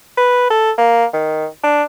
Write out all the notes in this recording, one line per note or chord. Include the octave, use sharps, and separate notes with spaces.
B4
A4
A#3
D#3
D4